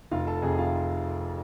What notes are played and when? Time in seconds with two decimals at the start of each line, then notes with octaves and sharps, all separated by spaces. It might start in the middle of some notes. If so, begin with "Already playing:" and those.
0.11 F1 F4 F5
0.27 A4 A5
0.42 F2 C3 G#4 G#5
0.58 F4 F5